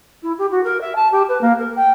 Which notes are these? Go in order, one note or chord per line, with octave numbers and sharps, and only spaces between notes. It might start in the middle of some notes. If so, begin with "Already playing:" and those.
E4
G4
F#4
A#4
E5
A5
G4
B4
A#3
A#4
G5